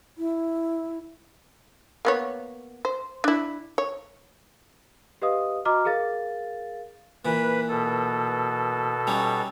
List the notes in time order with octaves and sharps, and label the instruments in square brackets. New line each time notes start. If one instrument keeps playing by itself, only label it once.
[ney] E4
[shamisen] A#3 B3 C#5
C5
D4 E4
C#5
[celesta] G4 B4 D#5 F5 D#6
F#4 D#5 A#5 D6 F6
G#4 A#4 F5 A6
[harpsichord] A#2 E3 [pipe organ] B4
[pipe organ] B2 A4
[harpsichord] G3 C#4 D#4